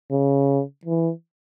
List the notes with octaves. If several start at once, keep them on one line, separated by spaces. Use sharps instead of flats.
C#3
E3